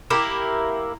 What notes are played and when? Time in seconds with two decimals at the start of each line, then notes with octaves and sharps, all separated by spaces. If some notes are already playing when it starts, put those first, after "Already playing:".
0.10 A#3 E4 G4 A#4